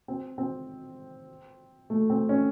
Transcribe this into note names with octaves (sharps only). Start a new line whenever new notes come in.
C4
C4
A3
C4
C#4